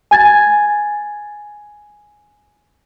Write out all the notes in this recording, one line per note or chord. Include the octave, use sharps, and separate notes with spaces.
G#5 G#6 A6